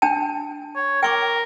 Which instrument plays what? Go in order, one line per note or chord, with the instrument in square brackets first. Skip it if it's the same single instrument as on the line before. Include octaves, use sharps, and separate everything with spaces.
[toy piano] D4 G5 A5
[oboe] C#5
[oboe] A#4 [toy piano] G5 C#6 D6